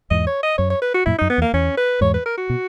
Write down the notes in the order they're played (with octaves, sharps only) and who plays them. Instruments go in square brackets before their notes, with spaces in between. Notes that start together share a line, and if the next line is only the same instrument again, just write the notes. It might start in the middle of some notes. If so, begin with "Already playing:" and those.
[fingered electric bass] E2 G#2 [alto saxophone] D#5
[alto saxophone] C#5
D#5
[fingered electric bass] F#2 [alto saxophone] C#5
[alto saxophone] C#5
B4
F#4
[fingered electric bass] F#2 A#2 [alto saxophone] E4
[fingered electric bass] F#2 [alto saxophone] D#4
[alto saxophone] B3
[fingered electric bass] E2
[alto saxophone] A#3
[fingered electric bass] E2 [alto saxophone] C#4
[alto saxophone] B4
[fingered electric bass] E2 G#2 [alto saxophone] C#5
[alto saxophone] B4
A#4
F#4
[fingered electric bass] B2